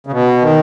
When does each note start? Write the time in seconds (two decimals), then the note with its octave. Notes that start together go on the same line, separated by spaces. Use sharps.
0.07 C#3
0.12 B2
0.42 D#3